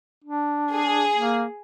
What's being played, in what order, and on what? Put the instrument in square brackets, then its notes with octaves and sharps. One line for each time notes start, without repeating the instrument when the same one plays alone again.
[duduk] D4
[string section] G#4
[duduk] A#3